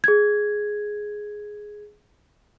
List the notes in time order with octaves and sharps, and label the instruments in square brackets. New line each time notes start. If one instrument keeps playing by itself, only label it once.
[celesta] G#4 G#6